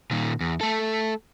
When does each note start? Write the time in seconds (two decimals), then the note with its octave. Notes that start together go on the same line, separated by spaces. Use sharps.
0.11 A#2 D#3
0.40 E2
0.61 A3 A4